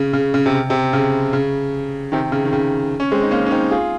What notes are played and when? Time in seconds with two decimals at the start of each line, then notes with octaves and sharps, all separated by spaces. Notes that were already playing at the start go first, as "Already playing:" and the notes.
Already playing: C#3
0.13 C#3
0.34 C#3
0.46 C3
0.70 C3
0.93 C#3
1.33 C#3
2.12 C3 D#3
2.32 C#3
2.45 D#3
2.53 C#3
3.00 C#4
3.12 G#3 C4
3.23 D#4
3.31 A#3 C#4
3.46 C#4
3.51 C4 D#4
3.71 F4 G#4